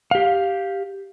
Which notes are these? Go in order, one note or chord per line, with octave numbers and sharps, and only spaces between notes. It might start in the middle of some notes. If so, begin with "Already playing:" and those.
G4 F5